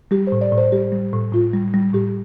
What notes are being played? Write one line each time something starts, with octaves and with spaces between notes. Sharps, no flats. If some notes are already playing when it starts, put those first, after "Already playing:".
G3 G4
C5
A2
D5
A2
C5
G3 G4
G3
A2
A2 F4
G3
G3
A2 G4